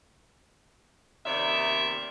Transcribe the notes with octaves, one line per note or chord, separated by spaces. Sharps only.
D#2 C3 B3 D#4 D5 E5